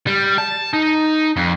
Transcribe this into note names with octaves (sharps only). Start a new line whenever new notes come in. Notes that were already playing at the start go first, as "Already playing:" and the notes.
G3
A5
D#4
F2